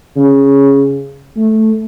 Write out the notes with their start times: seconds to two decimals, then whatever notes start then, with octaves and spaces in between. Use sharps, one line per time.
0.16 C#3
1.36 A3